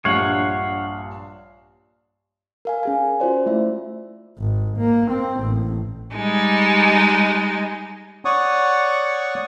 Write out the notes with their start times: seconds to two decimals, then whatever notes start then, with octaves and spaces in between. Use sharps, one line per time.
0.05 A#1 G2 A#2 C#5 F5 F#5
2.65 A#4 F5 G#5
2.83 C#4 G#4 G#5
3.20 F4 F#4 C5 D5
3.46 A3 E4 E5
4.39 G#1
4.78 A#3
5.11 C4
5.41 A1
6.16 G3 G#3 D#4
8.25 C#5 D5 F#5 C#6 D#6